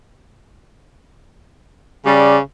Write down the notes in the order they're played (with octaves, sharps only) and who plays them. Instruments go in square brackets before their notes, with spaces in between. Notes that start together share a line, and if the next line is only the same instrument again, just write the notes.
[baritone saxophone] C#3 [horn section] G3 D5